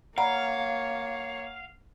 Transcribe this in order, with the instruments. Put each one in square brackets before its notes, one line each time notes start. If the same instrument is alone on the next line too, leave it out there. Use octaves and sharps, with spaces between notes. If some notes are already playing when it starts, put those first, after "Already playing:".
[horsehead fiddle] A#3 C#5 [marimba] D5 A#5 B5 [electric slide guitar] F5 [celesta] F#5